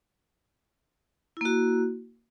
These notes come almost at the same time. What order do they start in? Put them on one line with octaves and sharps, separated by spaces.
E4 A#3 F#4